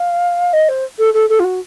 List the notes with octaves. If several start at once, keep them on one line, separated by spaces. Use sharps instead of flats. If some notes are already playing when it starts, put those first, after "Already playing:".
Already playing: F5
D#5
C5
A4
A4
A4
F4
F#4